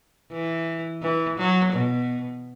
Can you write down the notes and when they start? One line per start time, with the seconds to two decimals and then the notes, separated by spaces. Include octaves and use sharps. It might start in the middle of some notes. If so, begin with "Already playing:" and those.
0.32 E3
1.02 E3
1.38 F#3
1.73 B2